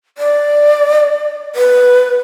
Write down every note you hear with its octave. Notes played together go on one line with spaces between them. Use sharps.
D5
B4